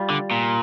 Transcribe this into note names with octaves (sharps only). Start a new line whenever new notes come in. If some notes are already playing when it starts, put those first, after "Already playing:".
Already playing: G3 F4
D3
A#2